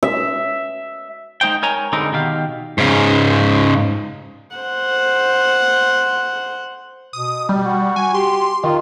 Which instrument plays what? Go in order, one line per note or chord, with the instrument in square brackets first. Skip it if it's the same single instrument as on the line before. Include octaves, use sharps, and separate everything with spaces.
[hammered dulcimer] E5
[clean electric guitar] G#3 D#4 C5 G5
A#4 C#5 G#5 A#5
D3 G3 G#3 C4 D#4 A#4
B2 D#3 G4 F5
[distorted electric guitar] G#2 C#3
[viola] C5 F#5
[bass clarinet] B2 [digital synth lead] D#6
[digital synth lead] G3
[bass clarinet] F#4
[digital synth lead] G#5
[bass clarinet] G4 [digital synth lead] C6
[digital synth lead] D#3 [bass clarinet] F4